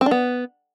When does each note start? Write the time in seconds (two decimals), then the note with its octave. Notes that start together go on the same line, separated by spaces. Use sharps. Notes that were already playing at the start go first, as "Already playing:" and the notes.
0.01 C4
0.06 D4
0.11 B3